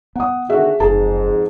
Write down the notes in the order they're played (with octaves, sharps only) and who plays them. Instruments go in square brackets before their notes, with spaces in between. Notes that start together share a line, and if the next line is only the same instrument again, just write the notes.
[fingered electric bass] B3 [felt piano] F#5 D#6
[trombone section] D3 D#3 F#4 [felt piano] G#4 E5
[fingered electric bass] F#1 [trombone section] F2 G#2 [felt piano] G#4 A5